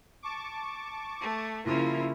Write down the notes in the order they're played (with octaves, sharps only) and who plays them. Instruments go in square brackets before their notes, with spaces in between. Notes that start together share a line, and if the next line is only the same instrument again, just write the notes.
[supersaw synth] A5 C#6 D6
[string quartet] A3
[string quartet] C#3 F3 A#3 [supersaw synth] E4